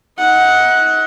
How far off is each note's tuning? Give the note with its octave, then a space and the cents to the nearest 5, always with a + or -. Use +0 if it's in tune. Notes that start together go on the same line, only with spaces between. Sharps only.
D#4 +35 F#5 +0